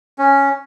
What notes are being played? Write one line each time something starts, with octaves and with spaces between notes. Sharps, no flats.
C#4